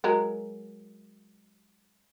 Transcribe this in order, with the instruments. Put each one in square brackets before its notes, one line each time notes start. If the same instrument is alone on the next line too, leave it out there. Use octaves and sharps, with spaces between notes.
[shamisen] F#3 G#3 A#4